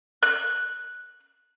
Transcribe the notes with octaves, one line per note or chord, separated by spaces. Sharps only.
F#6